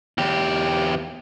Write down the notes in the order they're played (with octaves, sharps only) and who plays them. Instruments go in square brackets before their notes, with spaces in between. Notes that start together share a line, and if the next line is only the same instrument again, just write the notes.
[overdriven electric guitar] E2 G4